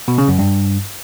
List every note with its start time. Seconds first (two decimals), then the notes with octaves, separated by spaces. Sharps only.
0.08 B2
0.18 C#3
0.28 F#2
0.39 G2